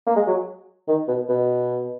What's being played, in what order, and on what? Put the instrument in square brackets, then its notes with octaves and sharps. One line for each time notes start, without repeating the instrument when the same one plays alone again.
[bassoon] A#3
G#3
F#3
D#3
B2
B2